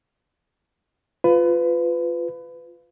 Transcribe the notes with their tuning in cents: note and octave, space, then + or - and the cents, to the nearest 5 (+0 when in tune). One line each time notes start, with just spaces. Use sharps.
F4 +0 B4 +25